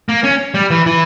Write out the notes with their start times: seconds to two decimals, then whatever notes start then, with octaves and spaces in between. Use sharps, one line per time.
0.09 A#3
0.24 C#4
0.54 G3
0.70 E3
0.86 E3